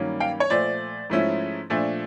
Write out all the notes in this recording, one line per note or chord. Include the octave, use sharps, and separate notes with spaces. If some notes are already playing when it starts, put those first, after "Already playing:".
Already playing: G2 D#3 F#3 A#3 C#4
F5 G5
C#5
A#2 F3 A3 C5 D5
G#2 F3 A3 C#4 E4
A#2 F3 A3 D4